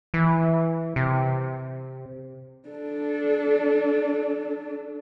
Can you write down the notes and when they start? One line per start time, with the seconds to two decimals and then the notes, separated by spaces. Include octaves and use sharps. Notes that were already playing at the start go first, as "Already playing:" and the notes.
0.14 E3
0.96 C3
2.69 D4 A4